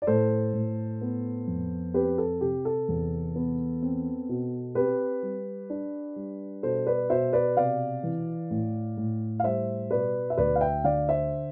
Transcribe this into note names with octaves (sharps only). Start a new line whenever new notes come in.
D5
A2 A4 C5
A2
B3
F2
C4 G4 B4
A4
C3 G4
A4
E2
B3
C4
B2
C4 G4 B4
G3
D4
G3
B2 A4 C5
B4 D5
B2 C5 E5
B4 D5
C3 D5 F5
E3
A2
A2
F5
G3 C5 E5
B2 B4 D5
E5
D2 B4 D5
F5
E5 G5
D3 D5 F5
C5 E5